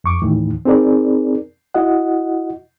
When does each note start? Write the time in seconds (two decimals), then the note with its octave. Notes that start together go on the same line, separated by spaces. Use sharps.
0.04 F2 C#6 D6
0.22 D#2 A2 D#3 E3
0.65 C4 D#4 G#4 A#4 D5
1.74 E4 F#4 D#5 F#5